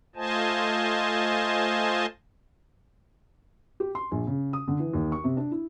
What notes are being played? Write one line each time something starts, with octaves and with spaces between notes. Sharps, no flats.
A3 F4 C5 D#5 G#5 A5
G4
C6
A#1
C#3
D#6
D3
E3
D#2
C#6
C3
D4
E4